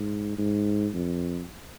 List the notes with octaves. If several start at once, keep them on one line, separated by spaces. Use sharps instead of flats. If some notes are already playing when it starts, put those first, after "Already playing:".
Already playing: G#2
G#2
F2